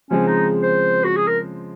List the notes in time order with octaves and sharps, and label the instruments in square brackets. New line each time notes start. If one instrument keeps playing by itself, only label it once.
[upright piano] C#3 F3 G#3 C4 [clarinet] C#4
[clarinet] D#4
C5
F#4
G#4
A#4